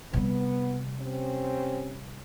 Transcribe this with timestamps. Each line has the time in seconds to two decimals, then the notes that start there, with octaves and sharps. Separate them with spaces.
0.13 C3 G3 B3
1.02 C4 C#4 G4